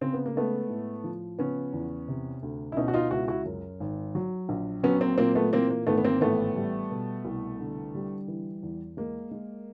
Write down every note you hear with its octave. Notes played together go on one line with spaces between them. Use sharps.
C#3 C4
B3
A#3
G#3 A3 B3
A2
F3
C#3 B3 C#4
E2
C3
D2
E4
B2 C#4 D#4
F#4
D#4 F4
C#2 E4 F#4
E4 F#4
F#2
G#1
F#3
A#1
F#3 B3 C#4
A#3 C4
A#2 A#3 C4
A3 B3
E3 A#3 C4
A#3
G#1 A3 B3
B3
A#3 C4
A1 A3 B3
G3
B2
C2
D3
G3
E3
E2
G#3 A#3
G#3